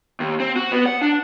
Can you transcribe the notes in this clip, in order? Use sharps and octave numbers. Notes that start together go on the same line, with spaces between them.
D#2
C4
F#4
B3
F#5
D4